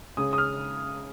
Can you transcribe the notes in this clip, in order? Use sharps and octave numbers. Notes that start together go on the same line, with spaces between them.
C#3 G#3 C#4 D#6
D#6
F6